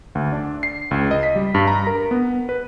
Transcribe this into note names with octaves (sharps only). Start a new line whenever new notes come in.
D2
D4
C7
C#2
D#5
B6
G3
G2
A#5
A#4
B3
B4